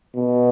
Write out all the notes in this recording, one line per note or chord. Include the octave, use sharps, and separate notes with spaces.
B2